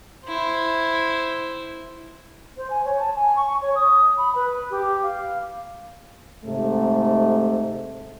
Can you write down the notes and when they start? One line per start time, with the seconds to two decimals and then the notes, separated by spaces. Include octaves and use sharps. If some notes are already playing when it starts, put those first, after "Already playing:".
0.25 E4 C5
2.57 C5
2.70 G#5
2.85 C#5
2.99 A5
3.16 G#5
3.36 C#6
3.62 C#5
3.75 D#6
4.18 B5
4.35 B4
4.71 G4
5.03 F5
6.44 G#2 C3 A3